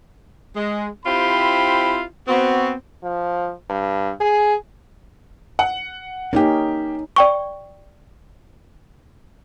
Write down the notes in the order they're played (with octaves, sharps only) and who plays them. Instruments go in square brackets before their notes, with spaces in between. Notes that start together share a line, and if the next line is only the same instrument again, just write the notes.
[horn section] G#3
C4 E4 F4 G4 C5 B5
B3 C4 F#4
[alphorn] F3
G2
G#4
[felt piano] F#5
[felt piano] A#3 G4 [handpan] C#4 D#4
[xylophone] D5 G5 C#6